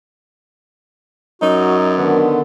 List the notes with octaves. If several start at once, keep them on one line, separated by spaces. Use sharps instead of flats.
F#2 D#4 F#4
D3 D#3 B3